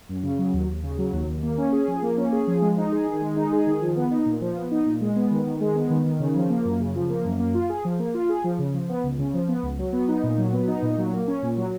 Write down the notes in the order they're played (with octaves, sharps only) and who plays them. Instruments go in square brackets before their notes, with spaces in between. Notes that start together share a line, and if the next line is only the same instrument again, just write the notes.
[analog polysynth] F#2
C#3
F#3
D#2
D#2
C#3
F#3
D#2
D#2
A#3
C#4
G#4
F3
A#3
C#4
G#4
F3
G#3
D#4
G#4
D#3
G#3
D#4
G#4
D#3
F3
B3
D#4
A#2
F3
B3
D#4
A#2
G#3
B3
D#3
D#3
G#3
B3
D#3
D#3
C#3
F3
A#3
F#2
C#3
F3
A#3
F#2
A#3
F4
G#4
F3
A#3
F4
G#4
F3
C#3
F3
B3
C#2
C#3
F3
B3
C#2
F#3
B3
D#4
A#2
F#3
B3
D#4
A#2
F#3
A#3
C#4
A#2
F#3